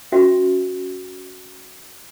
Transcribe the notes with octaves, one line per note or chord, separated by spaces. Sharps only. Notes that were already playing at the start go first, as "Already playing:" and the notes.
C#4 F#4 E5 G5